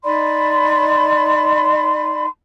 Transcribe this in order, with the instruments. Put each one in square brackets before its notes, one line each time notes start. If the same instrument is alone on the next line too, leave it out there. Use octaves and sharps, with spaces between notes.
[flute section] D#4 D5 B5 C6